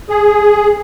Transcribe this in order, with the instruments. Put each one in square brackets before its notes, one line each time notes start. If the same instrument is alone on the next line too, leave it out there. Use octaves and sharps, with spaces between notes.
[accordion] G#4